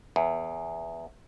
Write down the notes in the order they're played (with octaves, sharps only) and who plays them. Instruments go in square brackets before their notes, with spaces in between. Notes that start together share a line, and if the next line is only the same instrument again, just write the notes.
[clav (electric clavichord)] E2